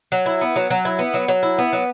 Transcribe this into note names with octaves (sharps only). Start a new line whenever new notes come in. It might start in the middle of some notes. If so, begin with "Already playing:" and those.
F#3
E4
B3
F#3
F#3
E4
B3
F#3
F#3
E4
B3
F#3